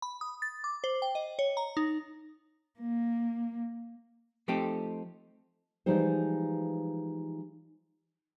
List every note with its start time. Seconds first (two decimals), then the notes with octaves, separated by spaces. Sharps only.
0.02 B5
0.21 D#6
0.42 A6
0.64 D6
0.84 C5
1.02 G5
1.15 D#5
1.39 C#5
1.57 A#5
1.77 D#4
2.80 A#3
4.48 F3 A3 C4 D#4 G4 A4
5.86 E3 F3 G3 G#3 D#4 C5